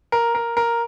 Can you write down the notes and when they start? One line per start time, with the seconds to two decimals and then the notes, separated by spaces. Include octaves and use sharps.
0.12 A#4
0.35 A#4
0.57 A#4